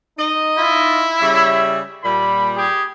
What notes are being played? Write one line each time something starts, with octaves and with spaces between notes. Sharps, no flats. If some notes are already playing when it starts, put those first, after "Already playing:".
D#4 D#5
E4 F4
C#3 G3 E5
A#2 G3 B5
G4 G#4